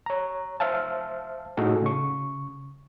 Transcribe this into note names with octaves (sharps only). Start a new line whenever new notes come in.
C#5 A#5
C5 E5 F5 A5
A2 D#4 F#4 G#4 A4
C#3 C#6